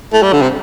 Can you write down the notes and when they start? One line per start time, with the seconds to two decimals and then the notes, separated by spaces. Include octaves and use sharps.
0.13 A3
0.23 G3
0.33 D3
0.42 C3